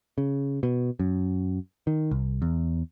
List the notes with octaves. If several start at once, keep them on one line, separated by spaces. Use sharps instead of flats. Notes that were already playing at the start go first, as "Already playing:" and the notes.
C#3
B2
F#2
D#3
C2
E2